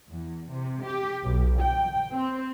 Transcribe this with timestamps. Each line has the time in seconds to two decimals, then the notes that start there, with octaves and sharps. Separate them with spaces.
0.10 E2
0.52 C3
0.83 G4
1.23 B1
1.61 G5
2.14 C4